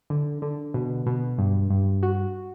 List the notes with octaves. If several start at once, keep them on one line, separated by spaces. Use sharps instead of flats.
D3
D3
B2
B2
G2
G2
F#4